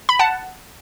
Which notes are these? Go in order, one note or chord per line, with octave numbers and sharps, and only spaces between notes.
B5
F#5 A5